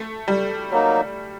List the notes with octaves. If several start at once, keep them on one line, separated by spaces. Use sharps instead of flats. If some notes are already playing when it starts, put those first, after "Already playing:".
Already playing: A3
G3
F#3 A#3 D#4